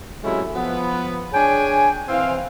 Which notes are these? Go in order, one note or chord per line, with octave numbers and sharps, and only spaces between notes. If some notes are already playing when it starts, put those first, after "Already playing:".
C3 F#3 G#3 A3 C#4 E4
F3 B3
D4 G#4 C#5 G5 G#5
E3 C4 F5